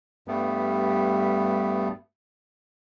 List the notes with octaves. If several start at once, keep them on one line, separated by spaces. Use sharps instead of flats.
G2 G3 A3 B3